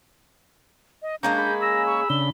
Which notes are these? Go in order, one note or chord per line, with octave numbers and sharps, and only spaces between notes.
D#5
G#3 A#3 C#4 D4 A#5 G6
G#4 B5
E6 A#6
C#6
C#3 D4 B5 G7